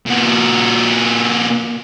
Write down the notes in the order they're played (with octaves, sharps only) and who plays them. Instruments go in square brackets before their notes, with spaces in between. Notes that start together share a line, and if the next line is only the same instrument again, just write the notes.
[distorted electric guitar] A#2 F#4